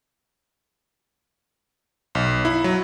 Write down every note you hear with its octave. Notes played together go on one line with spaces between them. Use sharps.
B1
E4
F#3